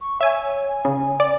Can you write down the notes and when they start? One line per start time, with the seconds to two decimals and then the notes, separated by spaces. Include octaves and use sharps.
0.01 C#6
0.21 C#5 E5 G#5
0.68 G#5
0.85 C#3
1.20 D5